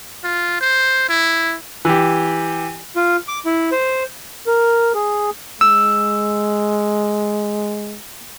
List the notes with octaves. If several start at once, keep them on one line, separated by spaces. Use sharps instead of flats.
F4
C5
E4
E3 G4
F4
D6
E4
C5
A#4
G#4
G#3 E6